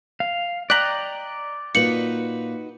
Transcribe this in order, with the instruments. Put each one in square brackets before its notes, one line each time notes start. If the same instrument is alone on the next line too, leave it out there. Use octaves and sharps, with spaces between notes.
[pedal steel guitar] F5
[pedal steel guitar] D5 G5 A#5 [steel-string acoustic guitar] D#5 [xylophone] F#6 B6 F#7
[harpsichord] A#2 [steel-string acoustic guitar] D#4 F#4 B4 [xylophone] C#7 F#7